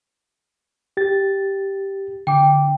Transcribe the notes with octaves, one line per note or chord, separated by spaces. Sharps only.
G4 A6
D3 G5 D6